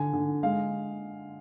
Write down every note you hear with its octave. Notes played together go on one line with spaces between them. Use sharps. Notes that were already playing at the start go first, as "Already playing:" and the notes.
Already playing: D3 G#5
D3
G#3 F5